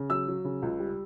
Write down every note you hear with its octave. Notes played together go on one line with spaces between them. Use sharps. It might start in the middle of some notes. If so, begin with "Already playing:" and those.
Already playing: C#3
F#3 E6
F#3
C#3
C#2
G3